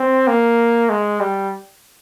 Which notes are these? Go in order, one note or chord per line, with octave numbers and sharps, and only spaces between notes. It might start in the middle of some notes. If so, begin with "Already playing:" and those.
Already playing: C4
A#3
G#3
G3